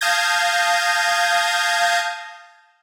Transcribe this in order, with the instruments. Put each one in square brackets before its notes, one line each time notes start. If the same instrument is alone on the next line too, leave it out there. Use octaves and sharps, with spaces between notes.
[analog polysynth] F5 A5 D#6 G6 G#6 A#6